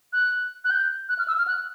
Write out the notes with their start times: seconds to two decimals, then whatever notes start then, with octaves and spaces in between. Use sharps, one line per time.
0.13 F#6
0.65 F#6
0.71 G6
1.09 F#6
1.19 F6
1.28 E6
1.38 F6
1.48 F#6